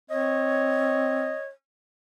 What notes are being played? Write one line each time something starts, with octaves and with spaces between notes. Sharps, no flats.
C4 C#5 D#5